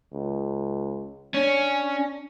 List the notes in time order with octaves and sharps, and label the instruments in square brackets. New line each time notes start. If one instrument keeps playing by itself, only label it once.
[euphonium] C#2
[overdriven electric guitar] C#4 [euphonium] D4